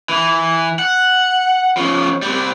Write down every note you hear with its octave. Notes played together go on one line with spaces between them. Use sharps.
E3
F#5
F3 C#4
G3 C4